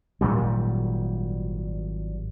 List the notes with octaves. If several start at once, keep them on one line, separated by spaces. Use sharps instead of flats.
G#1 A#2 F#3 G3